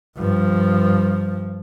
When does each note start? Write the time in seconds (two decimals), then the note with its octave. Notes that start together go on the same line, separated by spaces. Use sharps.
0.17 G2 F3